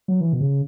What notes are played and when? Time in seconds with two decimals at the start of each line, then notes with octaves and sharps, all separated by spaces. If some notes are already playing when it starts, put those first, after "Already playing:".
0.08 F#3
0.21 E3
0.33 B2
0.40 C#3